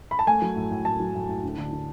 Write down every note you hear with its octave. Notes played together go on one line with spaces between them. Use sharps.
B5
A5
A3 G#5
F#3
A2
A2
A2 A5
F#3
A2
A2
D2
D3
D3